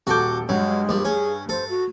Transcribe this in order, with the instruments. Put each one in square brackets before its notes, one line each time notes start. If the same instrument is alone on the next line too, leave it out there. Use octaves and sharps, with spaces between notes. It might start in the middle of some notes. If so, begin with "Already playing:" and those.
[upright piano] D#1 A4 G6 [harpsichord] F#4 D6
[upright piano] G2 [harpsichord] F#3 [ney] G#3
[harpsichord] A#1 G3
[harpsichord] C#4 [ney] G#4
[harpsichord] A4 [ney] C5
[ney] F#4